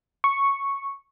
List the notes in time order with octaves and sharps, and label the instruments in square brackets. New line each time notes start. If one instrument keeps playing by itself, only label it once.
[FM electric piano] C#6